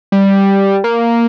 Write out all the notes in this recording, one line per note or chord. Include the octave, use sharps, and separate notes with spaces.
G3
A#3